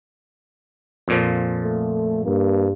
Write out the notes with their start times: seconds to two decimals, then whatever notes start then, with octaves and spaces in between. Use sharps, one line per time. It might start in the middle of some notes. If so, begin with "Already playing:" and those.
1.08 F2 A#2 F3
1.63 A3
2.25 G2 A#3